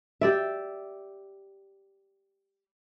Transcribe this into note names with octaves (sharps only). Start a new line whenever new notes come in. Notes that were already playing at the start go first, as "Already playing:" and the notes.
G4 D5 E5